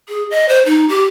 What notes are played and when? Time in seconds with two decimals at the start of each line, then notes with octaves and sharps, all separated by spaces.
0.09 G#4
0.31 D#5
0.49 C5
0.66 D#4
0.89 G4